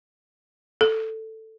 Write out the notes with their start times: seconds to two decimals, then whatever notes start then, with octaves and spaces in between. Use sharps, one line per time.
0.81 A4